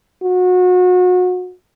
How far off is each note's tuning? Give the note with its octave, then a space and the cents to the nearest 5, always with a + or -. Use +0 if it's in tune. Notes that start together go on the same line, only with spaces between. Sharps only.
F#4 -30